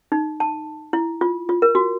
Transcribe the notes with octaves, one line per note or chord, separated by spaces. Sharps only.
D#4
A5
E4
F4
F4
A#4
F#4